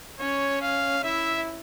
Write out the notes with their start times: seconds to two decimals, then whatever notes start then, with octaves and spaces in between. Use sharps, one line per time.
0.20 C#4 C#5
0.62 F5
1.04 E4 E5